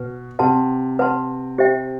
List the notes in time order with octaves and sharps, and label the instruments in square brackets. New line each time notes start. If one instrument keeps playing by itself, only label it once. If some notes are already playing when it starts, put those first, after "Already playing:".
Already playing: [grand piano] B2 [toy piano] B4
[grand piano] C3 [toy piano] B4 F#5 A5 C6
[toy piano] B4 F#5 A5 C6
G4 C5 E5 G5